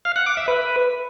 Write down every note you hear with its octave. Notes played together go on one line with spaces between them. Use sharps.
F5
F#5
D6
E5
B4